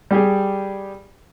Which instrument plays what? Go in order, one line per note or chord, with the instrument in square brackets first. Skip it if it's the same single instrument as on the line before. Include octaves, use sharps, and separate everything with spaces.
[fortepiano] G3 G4 G#4